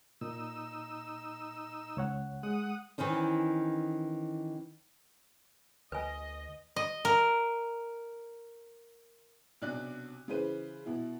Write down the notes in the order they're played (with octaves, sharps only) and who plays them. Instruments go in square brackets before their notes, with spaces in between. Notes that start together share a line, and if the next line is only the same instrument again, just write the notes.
[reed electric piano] A#2 [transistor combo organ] D#4 E6
[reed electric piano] C#2 C#5 F#5
[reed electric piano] G#3 [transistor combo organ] F#5 D#6
[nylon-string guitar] D#3 E3 C4 C#4 D#4
[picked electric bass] D2 [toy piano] B4 G#5 [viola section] D#5
[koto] D#5
A#4
[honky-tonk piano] B1 C3 D4 D5 F#6
C#3 E3 B4 C5 D#7
B2 E4